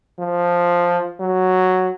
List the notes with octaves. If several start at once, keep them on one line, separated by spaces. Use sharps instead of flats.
F3
F#3